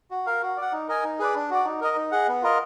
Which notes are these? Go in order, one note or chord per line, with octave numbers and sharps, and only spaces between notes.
F#4
A#4 F5
F#4
D5 F#5
D#4
A#4 D#5 G#5
D#4
G#4 B4 D5
D4
F#4 D5
D#4
A#4 D#5
D#4
G#4 D#5 F#5
B3
F4 A#4 D#5